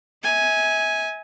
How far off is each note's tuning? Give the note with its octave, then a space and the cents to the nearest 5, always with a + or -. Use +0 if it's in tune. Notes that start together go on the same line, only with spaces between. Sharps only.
E5 -35 G#5 +0